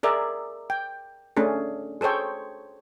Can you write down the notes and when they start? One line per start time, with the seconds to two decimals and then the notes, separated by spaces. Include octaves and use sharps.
0.03 G#4 A#4 D5 E5
0.70 G5
1.37 A3 C#4 D4 G#4
2.01 G#4 A4 C5 C#5 G5